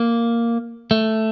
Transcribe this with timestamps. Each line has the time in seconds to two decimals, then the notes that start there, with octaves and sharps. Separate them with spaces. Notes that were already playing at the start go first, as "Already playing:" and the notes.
Already playing: A#3
0.91 A3